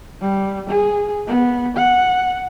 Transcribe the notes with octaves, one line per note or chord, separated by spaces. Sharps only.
G3
G#4
B3
F#5